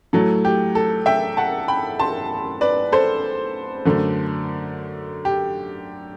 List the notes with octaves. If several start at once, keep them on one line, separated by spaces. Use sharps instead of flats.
A2 F#3 A3 A4
G4
A4
E5 G5
F#5 A5
G5 B5
A5 C6
B4 D5
A4 C5
F#2 D3 A3
G4